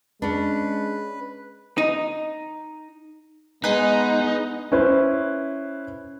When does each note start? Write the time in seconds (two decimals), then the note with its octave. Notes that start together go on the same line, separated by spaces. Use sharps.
0.22 G#3 C#4 D4 B4
1.78 D#4
3.64 G#3 B3 D#4 G#4 B4
4.72 C#4 E4 B4 C5